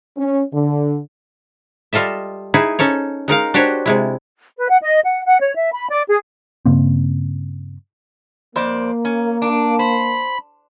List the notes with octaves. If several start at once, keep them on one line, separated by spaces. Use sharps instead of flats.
C#4
D3
G3 F4 A4 D#5 E5
D#4 E4 G#4 B4
C#4 D#4 A4 C#5
G#3 D#4 A#4 F5
D4 F#4 G4 C5 C#5
C3 G#3 E4
B4
F#5
D#5
F#5
F#5
C#5
E5
B5
D5
G#4
G2 C#3 A#3 C4
F2 A#3 C5 D5
C#4
D4 D6
C5 B5